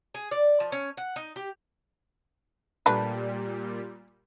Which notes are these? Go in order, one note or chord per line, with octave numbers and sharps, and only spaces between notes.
G#4
D5
F3
C#4
F#5
D#4
G4
A#2 G3 A3 D4 B4